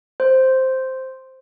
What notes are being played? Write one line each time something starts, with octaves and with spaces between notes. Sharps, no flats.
C5